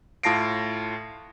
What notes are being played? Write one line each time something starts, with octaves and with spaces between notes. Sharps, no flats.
A2 F4 A5 A#6 C7 D7